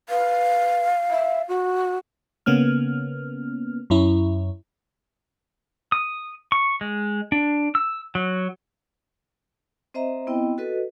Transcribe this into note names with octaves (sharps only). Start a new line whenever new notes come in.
B4 F5
E5
F#4
C#3 A#3 B3 C#4 F6
F#2 C#4 E4
D#6
C#6
G#3
D4
E6
F#3
C4 C5 D#5 E5 A#5
B3 C4 E4 D#5 G5
F#4 A4 B4 D#5